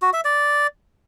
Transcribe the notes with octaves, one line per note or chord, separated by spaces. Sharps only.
F#4
E5
D5